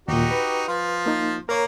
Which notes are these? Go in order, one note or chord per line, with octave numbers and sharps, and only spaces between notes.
D#2 A#2 D#4 F#4 G4
B4
F3 F4
A#3 D#4
A#3 A#4 C#5 A#5